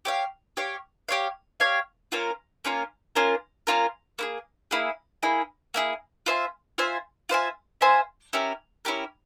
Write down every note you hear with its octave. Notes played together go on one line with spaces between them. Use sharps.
G4 C#5 F5
G4 C#5 F5
G4 C#5 F5
G4 C#5 F5
A#3 C#4 F4 A#4
A#3 C#4 F4 A#4
A#3 C#4 F4 A#4
A#3 C#4 F4 A#4
A#3 E4 G#4
A#3 E4 G#4
A#3 E4 G#4
A#3 E4 G#4
F4 C5 E5 G#5
F4 C5 E5 G#5
F4 C5 E5 G#5
F4 C5 E5 G#5
C#4 E4 G4 A#4
C#4 E4 G4 A#4